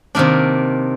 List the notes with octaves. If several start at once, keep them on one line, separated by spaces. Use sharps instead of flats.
C3 D#3 A#3 D4